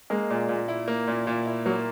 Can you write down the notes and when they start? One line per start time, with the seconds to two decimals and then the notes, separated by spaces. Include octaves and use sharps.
0.10 G#3 A#3
0.30 A#2
0.49 A#2
0.68 E4
0.88 A#3
1.08 A#2
1.27 A#2
1.46 E4
1.66 F#3 A#3